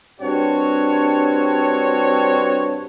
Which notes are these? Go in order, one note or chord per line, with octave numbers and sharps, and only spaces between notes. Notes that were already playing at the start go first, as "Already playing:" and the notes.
G2 C4 D4 F#4 C#5